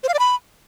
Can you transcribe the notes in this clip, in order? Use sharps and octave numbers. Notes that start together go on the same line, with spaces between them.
C5
F5
D5
B5